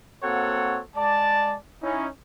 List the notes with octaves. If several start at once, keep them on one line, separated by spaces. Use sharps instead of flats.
A#3 C4 F#4 A4 C#5 F#5
G#3 D5 A5
C#4 D#4 E4